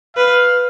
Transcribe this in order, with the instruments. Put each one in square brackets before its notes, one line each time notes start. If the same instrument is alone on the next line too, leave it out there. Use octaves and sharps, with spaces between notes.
[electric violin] B4 [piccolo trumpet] F5